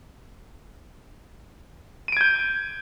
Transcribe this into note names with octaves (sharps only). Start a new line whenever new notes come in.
G6 G#6 D7 D#7